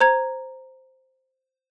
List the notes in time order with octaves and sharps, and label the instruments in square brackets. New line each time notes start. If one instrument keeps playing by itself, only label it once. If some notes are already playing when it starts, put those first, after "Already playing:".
[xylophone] C5 A#5 G#6